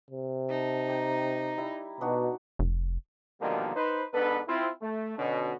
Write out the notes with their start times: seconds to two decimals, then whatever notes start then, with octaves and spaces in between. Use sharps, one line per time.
0.11 C3
0.49 D#4 A5
0.88 D5 G5 A#5
1.58 G3 E4
2.01 B2 D4 D#4 F#4
2.59 F1
3.40 B2 D3 D#3 F3 G3 A#3
3.76 D#4 B4 C5
4.13 G#2 B3 D4 A4 B4
4.48 C4 E4 F4
4.82 A3
5.18 B2 D3 C#4